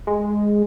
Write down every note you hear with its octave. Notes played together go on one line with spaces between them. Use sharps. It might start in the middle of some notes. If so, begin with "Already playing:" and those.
G#3